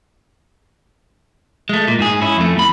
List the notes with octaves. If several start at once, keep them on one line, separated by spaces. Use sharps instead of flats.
G#3 A3
A#2
G#2 G#4
C#4 E4
F2 A3
E2 B5